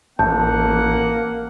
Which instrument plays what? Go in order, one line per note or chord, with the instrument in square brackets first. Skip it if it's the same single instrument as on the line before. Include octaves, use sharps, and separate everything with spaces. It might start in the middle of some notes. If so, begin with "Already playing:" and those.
[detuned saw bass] A1 [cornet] A#3 [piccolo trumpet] F#5 [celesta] A5 G6